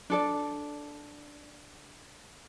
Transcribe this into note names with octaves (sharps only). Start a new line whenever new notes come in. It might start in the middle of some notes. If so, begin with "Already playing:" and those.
D4 A4 D5